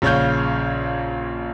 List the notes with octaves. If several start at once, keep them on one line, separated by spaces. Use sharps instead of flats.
A#1 C#3 C#5 F5 G6